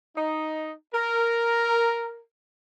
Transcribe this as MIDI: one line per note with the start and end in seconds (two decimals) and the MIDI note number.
0.17 0.72 63
0.94 2.19 70